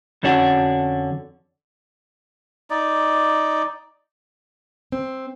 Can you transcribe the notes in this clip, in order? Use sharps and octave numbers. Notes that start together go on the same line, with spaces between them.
F2 D3 C#4 D4 F#4
D#4 D5
C4